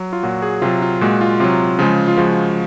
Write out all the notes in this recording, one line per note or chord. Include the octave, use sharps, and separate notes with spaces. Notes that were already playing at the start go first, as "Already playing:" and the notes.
Already playing: F#3
F4
A#2 F#3 F#4
G#4
C3 F#3 F4
F4
A#2 G#3 F#4
F4
C3 F#3 F4
C#3 F3 G#3
F4
C#3 F3 G#3 F#4